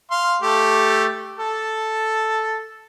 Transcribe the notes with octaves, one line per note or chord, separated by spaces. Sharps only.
F5 C6
A3 G4 A4
A4 A5